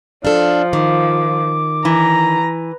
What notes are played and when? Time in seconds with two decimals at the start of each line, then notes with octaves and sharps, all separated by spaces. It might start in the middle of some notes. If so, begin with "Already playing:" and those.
0.25 F3 D4 A4 F5
0.73 D#3 D6
1.85 E3 A#5